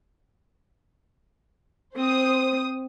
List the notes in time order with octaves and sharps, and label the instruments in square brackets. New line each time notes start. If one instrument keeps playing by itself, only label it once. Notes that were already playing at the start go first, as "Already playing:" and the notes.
[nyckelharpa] C4 [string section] C5 D#6